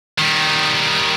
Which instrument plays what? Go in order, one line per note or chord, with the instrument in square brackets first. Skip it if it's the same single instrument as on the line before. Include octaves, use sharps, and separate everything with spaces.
[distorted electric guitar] D#3 G3